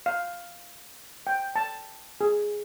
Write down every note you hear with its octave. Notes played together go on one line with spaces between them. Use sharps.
F5
G5
A5
G#4